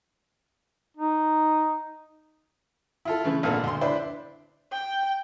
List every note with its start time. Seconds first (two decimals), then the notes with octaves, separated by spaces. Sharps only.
0.97 D#4
3.05 E4 F4 A4
3.24 C#3 E3 A3
3.43 G#1 A#2 D3 B3 A4 F5
3.64 D2 C6
3.81 D4 E4 B4 C5
4.72 G5